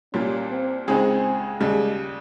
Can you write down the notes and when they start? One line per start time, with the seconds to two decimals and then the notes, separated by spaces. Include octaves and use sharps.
0.14 C2 A#2 G3 A#3 C#4 F4
0.51 C4
0.88 C#2 C#3 G#3 C4 D#4 G#4
1.60 D#2 C#3 G3 G#3